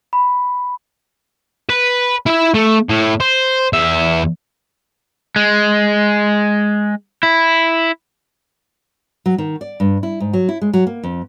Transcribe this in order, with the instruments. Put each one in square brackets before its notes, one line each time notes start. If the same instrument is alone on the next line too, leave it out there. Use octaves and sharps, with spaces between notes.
[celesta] B5
[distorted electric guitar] B4
E4 E5
A3
A2
C5
E2 E5
[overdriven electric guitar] G#3
E4
[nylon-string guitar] F#3
D#3
D5
G2
E4
G#2
F#3
E4
G#3
F#3
A#3
F2